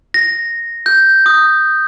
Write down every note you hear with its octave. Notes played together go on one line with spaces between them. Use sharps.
A#6
G6
D#6